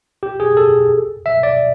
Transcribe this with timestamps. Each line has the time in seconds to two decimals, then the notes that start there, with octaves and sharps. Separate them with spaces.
0.23 G4
0.40 G#4
0.57 A4
1.26 E5
1.43 D5